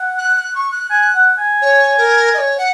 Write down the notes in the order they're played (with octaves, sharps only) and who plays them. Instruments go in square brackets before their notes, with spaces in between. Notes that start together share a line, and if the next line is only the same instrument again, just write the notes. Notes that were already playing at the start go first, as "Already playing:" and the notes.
Already playing: [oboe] F#5
[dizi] F#6
F#6
C#6
F#6
[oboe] G#5 [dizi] F#6
[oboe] F#5
G#5
[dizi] C#5
A#4
D#5
C#5
F#5